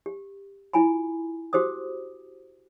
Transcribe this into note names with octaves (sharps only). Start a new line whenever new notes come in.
G4
E4 F4 G#5 A#5 B5
F#4 G4 C5 D6 D#6